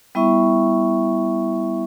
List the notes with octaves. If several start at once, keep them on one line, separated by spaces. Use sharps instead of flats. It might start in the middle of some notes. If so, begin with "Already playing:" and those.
G3 B3 E4 E5 C#6